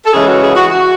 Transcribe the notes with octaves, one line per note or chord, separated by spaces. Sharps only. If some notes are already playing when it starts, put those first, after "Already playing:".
A4
C#3 E3 G#3 C#4 E4 G#4
F#4
G#4
F#4
F#4